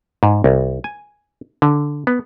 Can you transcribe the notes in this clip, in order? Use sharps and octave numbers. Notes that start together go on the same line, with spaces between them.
G#2
C2
G#5
D3
B3